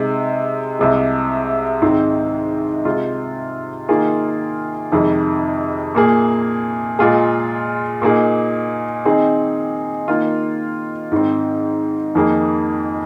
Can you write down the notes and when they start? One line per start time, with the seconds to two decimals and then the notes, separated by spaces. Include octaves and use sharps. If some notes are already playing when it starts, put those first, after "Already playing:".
Already playing: C3 G#3 D#4
0.79 C2 C3 G#3
1.82 G#2 D#3 G#3 C4
2.85 C3 G#3 F4
3.89 D#3 A#3 F4 G#4
4.92 F2 C3 D#3 G#3
5.95 A#2 A#3 G#4
6.99 A#2 G#3 F4 G#4
8.02 A#2 A#3 D#4 G#4
9.05 D#3 C4 D#4 G#4
10.08 D#3 A#3 F4
11.12 G#2 D#3 C4
12.15 F2 D#3 A#3 G#4